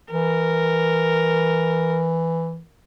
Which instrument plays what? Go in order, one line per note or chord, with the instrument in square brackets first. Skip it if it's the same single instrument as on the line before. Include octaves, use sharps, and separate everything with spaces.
[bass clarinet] E3 [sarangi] A#4